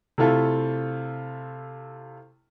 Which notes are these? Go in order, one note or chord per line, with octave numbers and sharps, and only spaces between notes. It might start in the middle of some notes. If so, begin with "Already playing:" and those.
C3 A3 E4 F4 A4